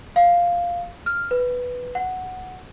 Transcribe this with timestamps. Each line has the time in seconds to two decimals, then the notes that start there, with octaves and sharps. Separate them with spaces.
0.16 F5
1.06 F6
1.31 B4
1.95 F#5